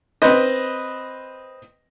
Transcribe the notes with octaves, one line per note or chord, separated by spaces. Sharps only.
C4 B4 C5 D#5